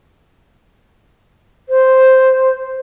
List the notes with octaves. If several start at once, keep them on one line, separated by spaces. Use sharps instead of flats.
C5